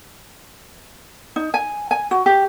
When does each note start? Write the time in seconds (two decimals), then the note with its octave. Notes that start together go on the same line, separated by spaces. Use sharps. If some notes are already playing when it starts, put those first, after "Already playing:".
1.36 D#4
1.54 G#5
1.91 G#5
2.11 F#4
2.26 G4